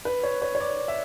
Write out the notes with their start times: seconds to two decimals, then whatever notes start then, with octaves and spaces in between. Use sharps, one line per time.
0.05 B4
0.23 C#5
0.42 C#5
0.55 C#5
0.60 D5
0.88 E5